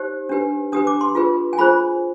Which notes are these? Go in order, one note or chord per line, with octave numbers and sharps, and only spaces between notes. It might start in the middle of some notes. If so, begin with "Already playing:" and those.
Already playing: D#4 G4 C5
D4 G4 B4
D4 G4 B4 D#6
D6
C6
F4 G#4 B4
G#5
F4 G#4 C5 B5